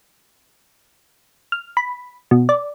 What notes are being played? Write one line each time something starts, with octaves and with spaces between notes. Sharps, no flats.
F6
B5
B2
D5